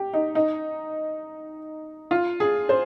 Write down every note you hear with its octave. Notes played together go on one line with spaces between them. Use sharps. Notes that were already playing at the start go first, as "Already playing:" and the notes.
Already playing: G4
D#4
D#4
F4
G#4
C5